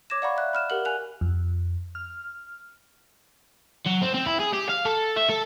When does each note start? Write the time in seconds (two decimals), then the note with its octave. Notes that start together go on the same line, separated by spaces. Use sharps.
0.10 C#5 D6 G#6 A#6 E7
0.22 D5 F5 F#5 A#5 B5 C#6
0.37 E5 F#6
0.53 B5 F6 E7
0.70 G4 A#4 F#5 F#7
0.85 G#5 F#6 F7
1.21 F2
1.95 F6
3.86 F#3
4.02 C4
4.14 C4
4.26 E4
4.40 G#4
4.54 G4
4.70 F5
4.86 A4
5.17 E5
5.29 A4